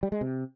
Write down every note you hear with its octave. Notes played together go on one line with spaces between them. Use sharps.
G3
G#3
C3